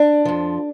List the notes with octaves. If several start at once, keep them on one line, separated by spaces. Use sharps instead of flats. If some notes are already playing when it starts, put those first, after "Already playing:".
Already playing: D4
F2 F3